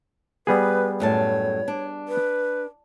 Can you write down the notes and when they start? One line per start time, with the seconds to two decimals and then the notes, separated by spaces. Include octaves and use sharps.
0.47 G3 B3 G#4 B4
1.00 F#2 A2 C#5 A5
1.68 D4
2.08 B4